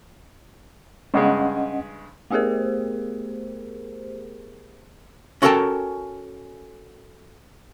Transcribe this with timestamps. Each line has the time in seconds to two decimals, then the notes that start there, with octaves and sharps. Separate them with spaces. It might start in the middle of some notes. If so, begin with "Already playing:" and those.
1.14 G2 C#3 G#3 C#4 D#5 F#5
2.30 A3 B3 G4 G#4 A#4 C5
5.42 C#4 F#4 A4 A#4 G5 A5